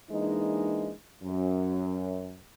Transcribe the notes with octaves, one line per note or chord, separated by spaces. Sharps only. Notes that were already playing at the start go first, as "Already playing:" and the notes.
E3 G#3 A#3 D4 D#4
F#2